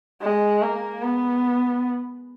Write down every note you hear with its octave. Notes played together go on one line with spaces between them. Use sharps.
G#3
A#3
B3